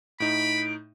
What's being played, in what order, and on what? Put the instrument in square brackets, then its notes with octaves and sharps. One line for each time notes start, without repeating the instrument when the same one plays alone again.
[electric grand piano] A2 D#4 [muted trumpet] B5 [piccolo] D7